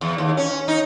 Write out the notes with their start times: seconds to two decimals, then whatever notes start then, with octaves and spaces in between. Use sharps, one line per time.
0.01 E2
0.18 D#2
0.37 C#4
0.68 D#4